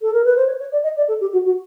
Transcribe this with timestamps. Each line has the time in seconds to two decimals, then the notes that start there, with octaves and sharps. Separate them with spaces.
0.02 A4
0.13 A#4
0.24 B4
0.36 C5
0.47 C#5
0.60 C#5
0.72 D5
0.83 D#5
0.97 D5
1.08 A4
1.21 G4
1.33 F#4
1.45 F#4